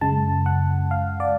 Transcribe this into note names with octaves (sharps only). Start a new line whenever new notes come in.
F#2 C#3 G#3 A5
F#5
F5
D5